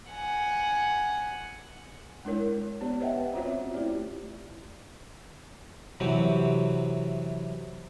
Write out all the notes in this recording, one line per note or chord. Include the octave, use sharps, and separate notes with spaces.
F#5 G#5
G#3 D4 E4 A#4 C#5
B3 D4 G4 C5 D5
B4 C#5 D#5 E5 F#5 G5
C4 C#4 F4 F#4 C5 C#5
E5
A3 E4 G4 D5
C3 E3 F#3 C4